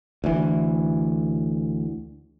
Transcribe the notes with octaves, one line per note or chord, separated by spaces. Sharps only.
D2 E3